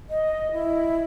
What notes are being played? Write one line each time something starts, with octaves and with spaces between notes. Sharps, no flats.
D#5
E4